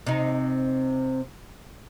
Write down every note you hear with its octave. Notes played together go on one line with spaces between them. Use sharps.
C3 D#4